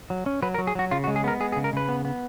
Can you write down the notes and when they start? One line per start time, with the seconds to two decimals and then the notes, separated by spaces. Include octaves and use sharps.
0.10 F#3
0.26 C#4
0.42 F#3 B4
0.54 A#4
0.59 F#3
0.67 G#4
0.75 F#3 F#4
0.91 C#3 F4
1.04 F#4
1.07 G#3
1.16 G#4
1.24 B3 A#4
1.40 G#3 G#4
1.52 G#4
1.56 C#3
1.64 A#4
1.73 C#3 B4
1.89 B3
2.05 B3